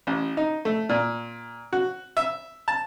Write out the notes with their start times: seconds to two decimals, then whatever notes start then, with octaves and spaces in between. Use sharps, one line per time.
0.07 A1
0.37 D#4
0.65 A3
0.89 A#2
1.73 F#4
2.17 E5
2.68 A5